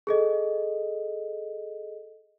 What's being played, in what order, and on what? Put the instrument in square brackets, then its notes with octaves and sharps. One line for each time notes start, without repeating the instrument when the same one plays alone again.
[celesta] G#4 A4 D#5